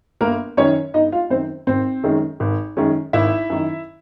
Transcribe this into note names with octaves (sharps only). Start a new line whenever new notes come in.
G1 A#3 A#4
F#2 D#3 C#4 C#5
G1 D#4 D#5
F4 F5
F#2 D#3 C4 C5
G#1 C4 C5
F#2 D#3 G#3 C#4
G#1
F#2 D#3 G#3 C#4
G#1 E4 E5
F#2 D#3